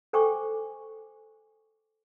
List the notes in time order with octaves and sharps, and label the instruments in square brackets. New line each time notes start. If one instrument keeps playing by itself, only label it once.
[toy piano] A4 C5 G5 G#5 C#6 D6